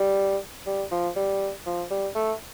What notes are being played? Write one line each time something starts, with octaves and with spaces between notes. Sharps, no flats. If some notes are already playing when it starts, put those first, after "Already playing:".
Already playing: G3
G3
F3
G3
F3
G3
A3